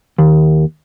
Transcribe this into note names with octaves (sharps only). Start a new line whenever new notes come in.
D#2